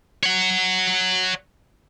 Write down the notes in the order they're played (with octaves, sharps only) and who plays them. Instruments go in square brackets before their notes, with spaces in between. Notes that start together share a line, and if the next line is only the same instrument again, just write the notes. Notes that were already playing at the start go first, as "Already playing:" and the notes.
[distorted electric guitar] C#5 F#5